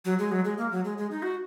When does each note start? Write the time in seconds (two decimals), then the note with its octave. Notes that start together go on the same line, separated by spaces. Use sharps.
0.05 F#3
0.19 G#3
0.31 F#3
0.45 G#3
0.58 A#3
0.72 F#3
0.85 G#3
0.98 G#3
1.11 D#4
1.22 F#4